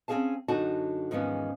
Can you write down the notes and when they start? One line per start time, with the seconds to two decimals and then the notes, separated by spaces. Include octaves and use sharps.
0.08 C4 C#4 F#4 G#4 F5 A5
0.48 F#2 D3 D#4 F#4 A5
1.11 E2 G#2 D#3 F3 B3 C#4